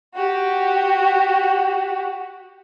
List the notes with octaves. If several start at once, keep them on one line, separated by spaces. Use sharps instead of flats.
F#4 G4